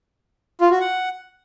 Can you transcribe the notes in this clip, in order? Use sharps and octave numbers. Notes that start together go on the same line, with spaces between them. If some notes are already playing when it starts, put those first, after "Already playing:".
F4
F#4
F#5